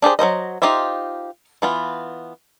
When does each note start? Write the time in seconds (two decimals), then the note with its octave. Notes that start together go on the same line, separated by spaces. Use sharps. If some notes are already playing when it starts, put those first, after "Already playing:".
0.02 D4 G4 G#4 C5
0.19 F#3 A#3 C5 D#5
0.62 D#4 F4 G4 C5 E5
1.62 E3 B3 F4